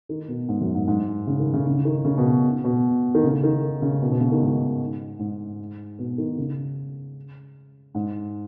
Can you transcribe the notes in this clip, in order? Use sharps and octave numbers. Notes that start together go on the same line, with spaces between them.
D#3
B2
G#2
F#2
G#2
G#2
C#3
D#3
C#3
C#3
D#3
C#3
B2
B2
D#3
C#3
D#3
C#3
B2
B2
C#3
D#3
G#2
G#2
B2
D#3
C#3
G#2